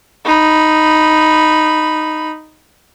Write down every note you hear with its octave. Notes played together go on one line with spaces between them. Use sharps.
D#4 B5